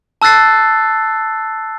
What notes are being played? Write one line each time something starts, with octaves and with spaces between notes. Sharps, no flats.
A5 E6 F#6 A6 C7